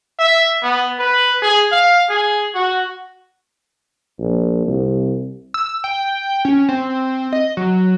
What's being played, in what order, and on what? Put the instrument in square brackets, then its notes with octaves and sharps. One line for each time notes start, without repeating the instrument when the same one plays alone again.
[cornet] E5
B3
B4
G#4
F5
G#4
F#4
[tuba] A#1
C2
[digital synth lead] E6
G5
C#4
C4
D#5
F#3